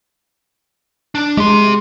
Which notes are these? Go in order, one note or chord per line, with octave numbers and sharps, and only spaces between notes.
D4
G#3 G4 C6